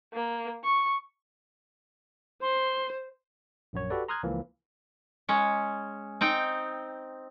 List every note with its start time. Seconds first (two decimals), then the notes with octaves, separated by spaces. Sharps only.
0.14 A#3
0.64 C#6
2.42 C5 C6
3.73 A#1 F#2 C#5
3.90 F#4 G4 A4 B4 D5
4.08 A#5 C6 D#6 F6 F#6 G#6
4.23 C#2 E3 F3 A#3
5.29 G#3 C#4
6.21 C4 D#4 G5